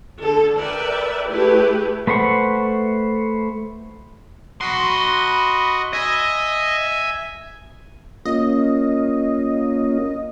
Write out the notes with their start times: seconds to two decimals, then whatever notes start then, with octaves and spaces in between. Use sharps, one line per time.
0.20 D3 A4
0.58 A#4 B4 D5 E5 G5
1.29 A3 E4 G4 G#4 B4
2.07 A3 B4 C5 F#5 C#6
4.61 F#4 D#5 B5 C6
5.93 D#5 E5 G#5
8.25 A#3 C#4 F4 D#5